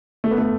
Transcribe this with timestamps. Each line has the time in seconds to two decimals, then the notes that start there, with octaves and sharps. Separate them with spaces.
0.24 A3
0.31 B3
0.38 A3